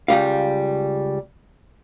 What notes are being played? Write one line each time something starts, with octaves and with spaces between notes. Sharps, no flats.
C#2 E3 G3 F5